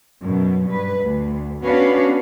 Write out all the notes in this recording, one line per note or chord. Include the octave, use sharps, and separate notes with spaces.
F#2 B2
G2 B4
D2
B3 C#4 D4 F#4 B4 F5